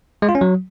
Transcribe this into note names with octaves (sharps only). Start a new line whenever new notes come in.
G#3
F4
C#4
F#3